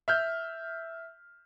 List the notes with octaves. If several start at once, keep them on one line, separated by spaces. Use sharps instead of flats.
E5 F6 G6